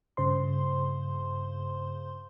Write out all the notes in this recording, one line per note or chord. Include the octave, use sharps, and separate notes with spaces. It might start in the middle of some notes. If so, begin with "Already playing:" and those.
G2 C#3 C5 C6